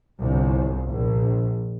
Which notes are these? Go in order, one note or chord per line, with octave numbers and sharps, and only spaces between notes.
G1 C2
A#1